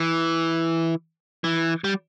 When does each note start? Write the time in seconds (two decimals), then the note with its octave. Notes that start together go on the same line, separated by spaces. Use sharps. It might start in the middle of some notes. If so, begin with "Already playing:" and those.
Already playing: E3
1.44 E3
1.84 G3